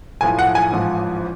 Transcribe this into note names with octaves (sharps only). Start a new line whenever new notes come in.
B1 A2 F3 G#5
F#5
G#5
A1 G#2 F3